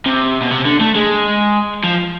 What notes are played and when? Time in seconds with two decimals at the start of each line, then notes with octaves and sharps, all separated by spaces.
0.06 C3
0.41 B2
0.51 C3
0.65 D3
0.80 A3
0.95 G#3
1.84 F3